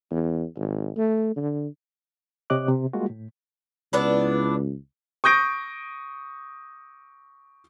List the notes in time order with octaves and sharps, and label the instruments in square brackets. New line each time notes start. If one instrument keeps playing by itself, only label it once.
[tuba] E2
G#1
A3
D3
[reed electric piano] C3 G4 C#5 D#5 D6 F#6
C3
G3 G#3 A#3 F4 F#4
A2
[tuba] C#2 [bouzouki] B3 D4 E4
[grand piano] C#6 D#6 G6 A#6 D7